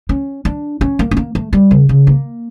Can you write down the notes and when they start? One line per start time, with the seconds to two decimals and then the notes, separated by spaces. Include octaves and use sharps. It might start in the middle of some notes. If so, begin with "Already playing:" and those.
0.09 C#4
0.45 D4
0.81 C#4
0.99 A#3
1.11 C#4
1.17 A#3
1.35 A3
1.53 G3
1.71 C#3
1.89 C#3
2.07 A#3